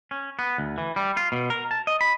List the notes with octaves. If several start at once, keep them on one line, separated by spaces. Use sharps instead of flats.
C#4
B3
D2
E3
G3
F4
B2
A#4
A5
D#5
B5